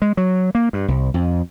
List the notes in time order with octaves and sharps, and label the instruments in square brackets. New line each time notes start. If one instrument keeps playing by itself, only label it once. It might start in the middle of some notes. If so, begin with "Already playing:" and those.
[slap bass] G#3
F#3
A#3
G2
C2
F2